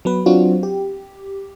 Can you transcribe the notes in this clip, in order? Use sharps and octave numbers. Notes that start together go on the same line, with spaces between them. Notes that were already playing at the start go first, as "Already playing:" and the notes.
F#3 B3 B4
F#3 C4 D4 F4 F#4
G4